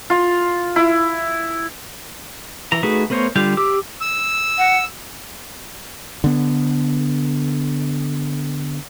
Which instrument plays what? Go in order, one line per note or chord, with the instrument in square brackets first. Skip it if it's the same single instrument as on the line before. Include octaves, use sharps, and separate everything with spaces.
[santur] F4
E4
[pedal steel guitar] E3 A#5
A3 D#4 F#4 G#4 B4
A3 B3 A#4 C5 C#5
D3 G3 F4 F5 G6
G4 D6 E6
[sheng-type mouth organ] E6
[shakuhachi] F#5
[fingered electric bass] D3 B3